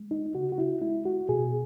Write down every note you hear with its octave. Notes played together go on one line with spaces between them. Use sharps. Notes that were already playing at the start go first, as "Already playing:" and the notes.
Already playing: G#3
D#4
C#3 F#4
F#4
E4
G#3 E4
F#4
B2 G#4